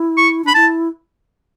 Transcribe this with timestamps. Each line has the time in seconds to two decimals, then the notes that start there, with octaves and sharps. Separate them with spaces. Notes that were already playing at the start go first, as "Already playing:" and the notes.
Already playing: E4
0.17 C#6
0.44 D4 B5
0.54 E4 A5